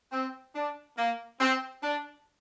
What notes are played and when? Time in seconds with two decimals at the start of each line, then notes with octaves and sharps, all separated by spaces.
0.12 C4
0.55 D4
0.97 A#3
1.40 C4
1.82 D4